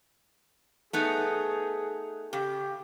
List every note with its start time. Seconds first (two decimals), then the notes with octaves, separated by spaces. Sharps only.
0.93 A3 B3 D#4 G#4
2.33 C#3 G4